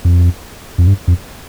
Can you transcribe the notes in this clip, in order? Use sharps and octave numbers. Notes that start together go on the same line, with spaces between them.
F2
F2
G2
F2